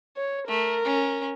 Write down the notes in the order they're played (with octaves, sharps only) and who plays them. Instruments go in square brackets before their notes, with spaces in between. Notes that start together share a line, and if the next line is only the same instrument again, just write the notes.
[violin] C#5
[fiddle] A3 [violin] A#4
[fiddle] C#4